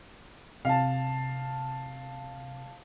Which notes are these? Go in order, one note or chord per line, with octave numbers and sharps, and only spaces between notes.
C3 F5 A5